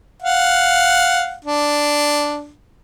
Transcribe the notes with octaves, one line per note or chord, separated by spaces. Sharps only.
F5 F#5
D4